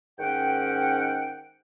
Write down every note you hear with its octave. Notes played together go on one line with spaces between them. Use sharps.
G#2 D#3 C#4 F#5 G5